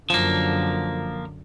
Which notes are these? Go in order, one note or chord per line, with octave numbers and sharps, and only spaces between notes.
F#2 D3 F3 A#3